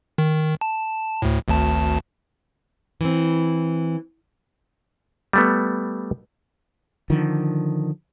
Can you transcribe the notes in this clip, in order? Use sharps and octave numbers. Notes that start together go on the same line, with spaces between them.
D#3
A5
D2 A2
G#1 D2 A5
E3 C4
G3 A3 B3
D3 D#3 F3